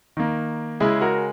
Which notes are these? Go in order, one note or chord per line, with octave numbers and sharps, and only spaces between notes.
D#3 A#3
C#3 G#3 E4 G#4
F#4 A#4